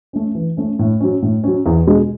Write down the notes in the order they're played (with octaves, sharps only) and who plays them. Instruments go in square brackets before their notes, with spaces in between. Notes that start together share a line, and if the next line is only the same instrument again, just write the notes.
[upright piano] A3 C#4
E3
A3 C#4
A2
F#3 C#4
A2
F#3 C#4
E2
B2 G#3